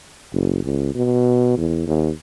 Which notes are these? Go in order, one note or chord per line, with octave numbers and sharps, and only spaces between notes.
F#1
C#2
B2
E2
D#2